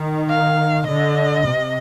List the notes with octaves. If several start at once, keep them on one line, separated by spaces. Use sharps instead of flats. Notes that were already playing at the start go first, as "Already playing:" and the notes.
Already playing: D#3
F5
D3 D#5
C3